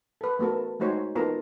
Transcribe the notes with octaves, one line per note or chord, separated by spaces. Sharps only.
A4 B4
A3 B3 F#4 A4 A#4
G#3 A3 D#4 F#4 C5 C#5
B3 D#4 F4 A4 A#4 A#5